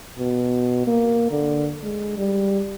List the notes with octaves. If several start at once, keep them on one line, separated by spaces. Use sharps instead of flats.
B2
A#3
D3
G#3
G3